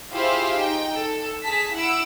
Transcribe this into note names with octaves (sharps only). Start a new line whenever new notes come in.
E4 F4 G4 G#4 C5 F5
D#4 G5
A4
G#4 A5 B6
E4 F#5 E6 D7